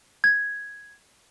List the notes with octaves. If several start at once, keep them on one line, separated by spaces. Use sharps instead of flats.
G#6